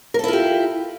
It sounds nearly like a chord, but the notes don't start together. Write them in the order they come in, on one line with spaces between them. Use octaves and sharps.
A#4 A4 E4 F4 G4